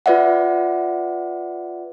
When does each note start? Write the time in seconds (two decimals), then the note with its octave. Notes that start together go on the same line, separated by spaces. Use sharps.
0.06 F4 B4 D5 E5 F#5